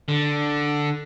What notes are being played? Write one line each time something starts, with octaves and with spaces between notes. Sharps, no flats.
D3